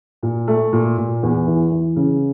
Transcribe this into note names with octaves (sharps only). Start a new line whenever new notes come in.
A#2
A3
A#2
A#2
E2
E3
E3
C#3